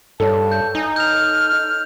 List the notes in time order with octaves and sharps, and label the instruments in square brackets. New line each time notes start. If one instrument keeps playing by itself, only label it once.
[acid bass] G2 [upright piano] A4 C#5 [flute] A5
[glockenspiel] G6
[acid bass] D#4 [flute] G#5
[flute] F6 [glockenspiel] G6 F7